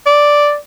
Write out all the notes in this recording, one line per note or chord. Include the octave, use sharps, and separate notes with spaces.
D5